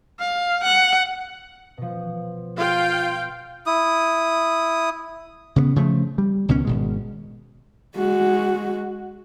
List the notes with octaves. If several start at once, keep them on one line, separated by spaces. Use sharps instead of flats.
F5
F#5
B2 F3
F4 F5 G5
E4 D#6
C#3 A#3 B3
C#3 F3 A3
G3
C#2 B2 D#3 C#4
G#1 B2 G#3
G#3 F#4